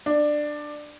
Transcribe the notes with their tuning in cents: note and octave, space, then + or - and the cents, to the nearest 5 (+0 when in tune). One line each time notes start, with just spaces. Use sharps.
D4 +15